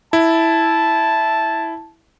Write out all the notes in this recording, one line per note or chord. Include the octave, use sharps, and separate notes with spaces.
E4 A5